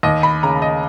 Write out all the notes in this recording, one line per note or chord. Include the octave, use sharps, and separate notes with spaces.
D#2 D#5
B5
C#3 A#5
D#5